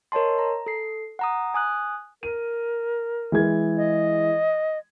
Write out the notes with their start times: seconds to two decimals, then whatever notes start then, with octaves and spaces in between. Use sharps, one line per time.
0.12 A#4 C#5 D#5 A5 C6
0.38 A#5
0.66 A4 C7
1.19 F#5 A#5 D#6
1.54 G#5 D#6 F#6
2.23 A#4 D#7
3.32 E3 G#3 G#6
3.77 D#5